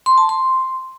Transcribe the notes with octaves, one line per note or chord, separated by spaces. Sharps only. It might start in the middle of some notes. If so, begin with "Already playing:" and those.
C6
A5
C6